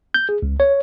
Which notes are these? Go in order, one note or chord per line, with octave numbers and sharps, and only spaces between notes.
G6
G#4
C#2
C#5